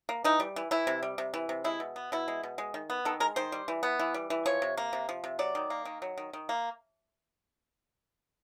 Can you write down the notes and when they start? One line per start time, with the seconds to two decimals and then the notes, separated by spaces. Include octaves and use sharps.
0.09 A#3
0.24 E3 D#4
0.40 G3
0.56 E3
0.71 E3 E4
0.87 C3
1.03 G3
1.18 C3
1.34 E3
1.49 C3
1.64 G#3 E4
1.80 B2
1.96 B3
2.12 B2 E4
2.28 G#3
2.43 B2
2.58 G#3
2.74 D#3
2.90 B3
3.05 D#3 A4
3.20 G#3 A#4
3.36 D#3 C5
3.52 G3
3.68 E3
3.83 B3
3.99 E3
4.14 G3
4.30 E3
4.46 F3 C#5
4.62 C3
4.77 A#3
4.93 C3
5.09 F3
5.24 C3
5.39 F#3 D5
5.55 D#3
5.70 A#3
5.85 D#3
6.02 F#3
6.18 D#3
6.33 D#3
6.49 A#3